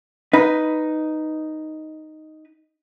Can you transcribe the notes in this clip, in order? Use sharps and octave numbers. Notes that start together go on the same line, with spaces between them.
D#4 B4